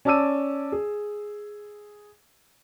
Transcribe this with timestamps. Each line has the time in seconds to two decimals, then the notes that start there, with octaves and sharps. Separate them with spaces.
0.05 C#4 D5 A5 D6 E6 D#7
0.72 G#4